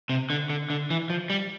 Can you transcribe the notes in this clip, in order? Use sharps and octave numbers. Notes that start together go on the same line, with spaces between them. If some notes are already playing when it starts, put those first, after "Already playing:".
C3
D3
D3
D3
E3
F3
G3